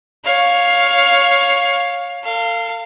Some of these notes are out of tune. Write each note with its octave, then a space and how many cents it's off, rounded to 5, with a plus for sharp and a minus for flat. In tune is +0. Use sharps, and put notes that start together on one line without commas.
C#5 +0 F5 +10
A4 +45 F5 -10